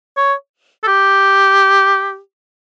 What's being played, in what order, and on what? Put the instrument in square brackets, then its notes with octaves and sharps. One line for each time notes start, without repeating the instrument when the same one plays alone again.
[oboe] C#5
A4
G4